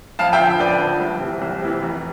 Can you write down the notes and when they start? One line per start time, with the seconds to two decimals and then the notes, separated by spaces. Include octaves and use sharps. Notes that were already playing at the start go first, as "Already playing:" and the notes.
0.19 F2 F5 A5
0.33 E5 G5
0.39 D3 F3
0.60 F2 B4 D5
0.81 D3 F3
1.00 C2
1.21 C3 E3
1.42 C2
1.62 C3 E3
1.82 F1